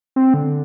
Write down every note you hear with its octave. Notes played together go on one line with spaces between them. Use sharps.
C4
D3